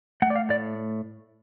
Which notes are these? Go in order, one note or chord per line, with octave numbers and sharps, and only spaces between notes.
A3 F#5
D5
F5
A2 D5